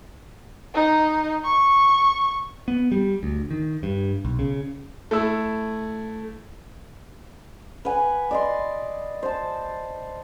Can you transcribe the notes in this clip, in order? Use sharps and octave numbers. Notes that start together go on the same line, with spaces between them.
D#4
C#6
B3
G3
D2
D#3
G2
B1
C#3
A3 E4 E6
B4 F#5 G#5
D5 D#5 C6
C5 A5